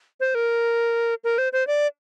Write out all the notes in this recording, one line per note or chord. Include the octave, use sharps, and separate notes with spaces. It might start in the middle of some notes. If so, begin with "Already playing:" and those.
C5
A#4
A#4
C5
C5
D5